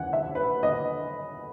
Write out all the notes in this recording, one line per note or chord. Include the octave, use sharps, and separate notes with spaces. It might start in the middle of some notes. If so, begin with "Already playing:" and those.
Already playing: D#2 C#3 E3 F#5 G#5
E5
B4
D#5